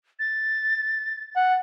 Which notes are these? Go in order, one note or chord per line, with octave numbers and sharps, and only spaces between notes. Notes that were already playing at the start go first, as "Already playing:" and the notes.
A6
F#5